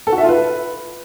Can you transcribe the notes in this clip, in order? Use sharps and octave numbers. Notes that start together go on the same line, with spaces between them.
A4
F#4
E5
F4
B4